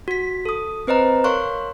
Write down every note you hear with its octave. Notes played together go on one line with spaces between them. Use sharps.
F#4 B6
A4 D#6
C4 B4 C5 D#5 A#5
A#4 C#5 F5 C6 C#6 F#6